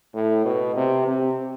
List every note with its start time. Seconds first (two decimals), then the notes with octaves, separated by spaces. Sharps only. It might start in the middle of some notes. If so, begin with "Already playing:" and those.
0.14 A2
0.45 B2
0.76 C3
1.07 C3